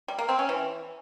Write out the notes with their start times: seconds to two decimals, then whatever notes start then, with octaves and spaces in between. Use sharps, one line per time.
0.08 G3
0.19 A#3
0.29 C4
0.39 C#4
0.49 E3